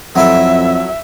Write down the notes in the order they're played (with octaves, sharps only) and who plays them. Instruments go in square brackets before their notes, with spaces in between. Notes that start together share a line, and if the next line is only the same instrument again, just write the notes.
[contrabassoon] F2 [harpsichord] F#3 E4 A4 [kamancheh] E5